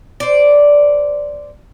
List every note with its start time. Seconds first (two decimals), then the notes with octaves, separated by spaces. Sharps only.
0.20 C5 D5